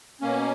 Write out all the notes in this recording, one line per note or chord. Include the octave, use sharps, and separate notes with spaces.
B2 A#3 C#4